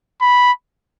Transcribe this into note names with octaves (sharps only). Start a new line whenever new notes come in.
B5